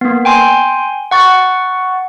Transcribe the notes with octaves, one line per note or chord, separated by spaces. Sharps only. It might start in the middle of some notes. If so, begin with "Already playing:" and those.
A#3 B3
G5 G#5 C6
F#5 C#6 A6